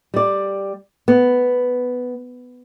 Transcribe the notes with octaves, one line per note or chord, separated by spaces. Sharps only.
G3 D5
B3